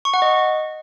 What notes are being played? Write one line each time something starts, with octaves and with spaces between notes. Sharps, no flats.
C#6
F#5
D#5